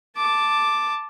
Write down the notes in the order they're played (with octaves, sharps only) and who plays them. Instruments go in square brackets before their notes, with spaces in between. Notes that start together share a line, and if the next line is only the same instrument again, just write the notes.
[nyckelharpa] A5 D6